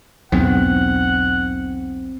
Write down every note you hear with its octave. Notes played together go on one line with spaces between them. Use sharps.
B1 E2 G#2 C4 F#5